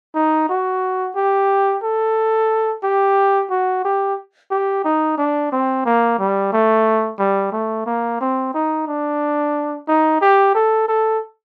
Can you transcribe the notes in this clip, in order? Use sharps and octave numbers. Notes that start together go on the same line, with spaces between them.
D#4
F#4
G4
A4
G4
F#4
G4
G4
D#4
D4
C4
A#3
G3
A3
G3
A3
A#3
C4
D#4
D4
D#4
G4
A4
A4